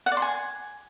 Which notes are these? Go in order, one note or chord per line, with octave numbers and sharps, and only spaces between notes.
F#5
D5
C6
G#5